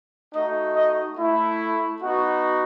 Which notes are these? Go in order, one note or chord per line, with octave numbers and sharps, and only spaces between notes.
A3 D#4 F#4 D#5
D#5
A3 E4
B3 D#4 F#4